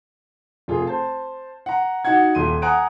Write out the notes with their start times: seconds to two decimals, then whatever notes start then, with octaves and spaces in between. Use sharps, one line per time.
0.68 F1 F4 G#4
0.87 C5 A5
1.66 F#5 A#5
2.05 D#4 F#4 F#5 G#6
2.35 D#1 C6 D#7
2.62 F#5 G#5 A#5 D#6 F#6 D7